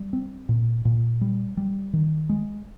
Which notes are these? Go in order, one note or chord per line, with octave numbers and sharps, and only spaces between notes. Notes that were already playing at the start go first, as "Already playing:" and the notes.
Already playing: G3
C4
A#2
A#2
G3
G3
D#3
G#3